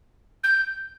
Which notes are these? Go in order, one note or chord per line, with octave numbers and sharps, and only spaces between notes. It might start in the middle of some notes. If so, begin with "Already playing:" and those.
G6